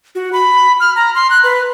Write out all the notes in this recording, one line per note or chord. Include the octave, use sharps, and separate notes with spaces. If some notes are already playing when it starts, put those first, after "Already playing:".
F#4
B5
F6
A#5
C6
F#6
B4